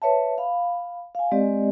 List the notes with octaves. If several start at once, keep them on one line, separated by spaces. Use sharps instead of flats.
B4 C#5 E5 A5
F5 B5
F5 G#5
G#3 C4 G4 D5 D#5